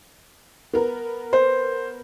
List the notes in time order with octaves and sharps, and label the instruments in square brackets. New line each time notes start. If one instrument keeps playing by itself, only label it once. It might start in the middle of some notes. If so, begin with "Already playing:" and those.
[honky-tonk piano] B3 A#4
[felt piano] C5